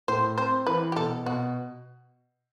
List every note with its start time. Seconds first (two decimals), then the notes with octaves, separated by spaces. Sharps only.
0.08 A2 C5
0.38 C4 C5
0.67 E3 B4
0.92 G4
0.96 B2 A4
1.26 B2 F#4